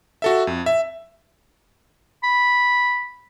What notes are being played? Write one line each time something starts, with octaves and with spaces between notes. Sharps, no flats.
F#4 A4 E5
F2
E5
B5